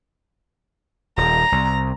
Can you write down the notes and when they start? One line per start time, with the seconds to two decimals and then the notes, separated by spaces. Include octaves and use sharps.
1.17 D#1 A#5
1.52 C2